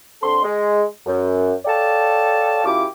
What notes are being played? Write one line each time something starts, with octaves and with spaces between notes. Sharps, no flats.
D3 C4 A4 C6
G#3
F#2
A4 C#5 D5 F5 G5 A5
F#2 E4 F4 G4 D6